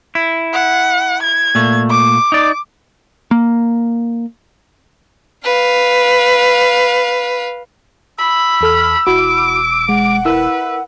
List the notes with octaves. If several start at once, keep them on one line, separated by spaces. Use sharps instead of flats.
E4
F#5
G#6
A#2 A3
D6
D#4 D5
A#3
B4 F5
B5 E6
E2 A4 F6
E1 E4 F#4 B5 D6
G#3 F#5
E4 A#4 B4 E6